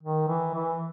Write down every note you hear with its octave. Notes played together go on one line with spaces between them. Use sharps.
D#3
E3
E3